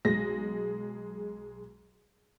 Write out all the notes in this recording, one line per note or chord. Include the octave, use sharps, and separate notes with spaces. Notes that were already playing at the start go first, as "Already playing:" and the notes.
B1 G#3 G#4 A#6